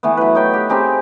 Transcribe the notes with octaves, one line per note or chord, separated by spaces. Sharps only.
E3 A3 B3
F#3 B4
D#4 C#5 G5 B5
G4
C4 D#4 G4 G#4